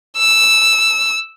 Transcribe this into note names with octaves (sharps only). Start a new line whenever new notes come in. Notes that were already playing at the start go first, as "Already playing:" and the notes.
E6